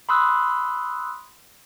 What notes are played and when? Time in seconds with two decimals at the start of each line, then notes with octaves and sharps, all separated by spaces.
0.09 B5 C6 D#6 E6 F#6